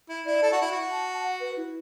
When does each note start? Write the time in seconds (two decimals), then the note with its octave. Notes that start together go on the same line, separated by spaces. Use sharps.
0.09 E4
0.26 E4 D5
0.43 A4
0.52 F#4
0.58 E4 F#5
0.72 F#4
0.91 A5
1.24 F#5
1.40 B4
1.57 E4